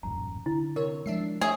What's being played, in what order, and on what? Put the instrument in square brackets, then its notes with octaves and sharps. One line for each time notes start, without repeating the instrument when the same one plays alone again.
[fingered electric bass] D#1 A1 F#2 [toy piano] A#5
[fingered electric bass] D3 [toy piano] E4
[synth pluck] C3 C#5 [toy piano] A#4
[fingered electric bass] F3 G#3 [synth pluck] D4 E5 C7
[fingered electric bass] A3 [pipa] G#4 [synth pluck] C#5 E5